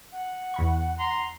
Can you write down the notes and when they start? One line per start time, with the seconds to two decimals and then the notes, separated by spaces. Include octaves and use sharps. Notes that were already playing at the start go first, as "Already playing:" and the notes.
0.12 F#5
0.54 E2 B5 C#6
0.99 A#5 C6